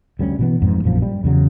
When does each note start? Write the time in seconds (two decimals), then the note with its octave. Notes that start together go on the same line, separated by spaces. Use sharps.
0.19 D2 G3 A#3 C#4
0.39 B2 E3 B3
0.62 F2 G#2
0.84 A#1 F#2 F3
1.02 G3
1.24 E2 C#3 F#3